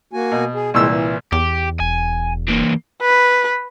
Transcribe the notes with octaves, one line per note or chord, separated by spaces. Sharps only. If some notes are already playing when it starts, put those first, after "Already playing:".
A#3 F#4 G#5
B2
G#4
C2 A#2 E3 G#3 E6
E3
E2 G4
E1 G#5
E3 A#3
B4